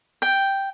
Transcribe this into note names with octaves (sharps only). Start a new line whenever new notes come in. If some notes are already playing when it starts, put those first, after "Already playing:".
G5